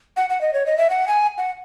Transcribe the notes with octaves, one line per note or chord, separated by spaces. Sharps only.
F#5
F#5
D#5
C#5
D#5
E5
F#5
G#5
F#5